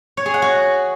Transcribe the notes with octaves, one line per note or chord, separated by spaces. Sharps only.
C#5
G#4
F#5
F#4